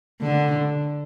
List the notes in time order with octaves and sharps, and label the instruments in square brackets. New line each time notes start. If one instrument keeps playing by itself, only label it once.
[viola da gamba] D3